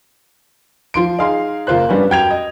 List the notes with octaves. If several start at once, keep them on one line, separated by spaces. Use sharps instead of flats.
F3 C6 D7
D#4 G#4 F5 C6
F#1 A#3 F4 C5 F#6
G2 G3 B3 C#4
F#2 G5 G#6 F7
D#5